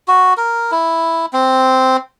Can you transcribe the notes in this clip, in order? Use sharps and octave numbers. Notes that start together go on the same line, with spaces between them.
F#4
A#4
E4
C4